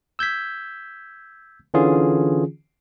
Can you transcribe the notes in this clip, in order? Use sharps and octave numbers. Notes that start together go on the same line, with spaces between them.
E6 G6 G#6 B6
D3 E3 C#4 F4 G#4